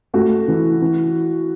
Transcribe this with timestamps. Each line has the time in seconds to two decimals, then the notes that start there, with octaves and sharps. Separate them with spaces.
0.14 A3 F#4
0.48 E3
0.82 E3